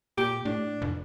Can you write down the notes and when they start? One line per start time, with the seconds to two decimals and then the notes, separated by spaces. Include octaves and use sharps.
0.18 A#2 G4
0.45 A2 D4
0.82 F1